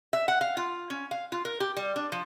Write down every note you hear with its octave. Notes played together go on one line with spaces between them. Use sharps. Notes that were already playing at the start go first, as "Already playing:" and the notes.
E5
F#5
F5
F4
C#4
F5
F4
A#4
G4
G3
D4
F3